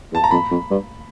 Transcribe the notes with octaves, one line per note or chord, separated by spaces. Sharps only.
E2
A5
A#5
F2 B5
F2
G2